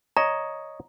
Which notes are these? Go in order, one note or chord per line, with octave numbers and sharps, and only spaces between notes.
C#5 D#5 A#5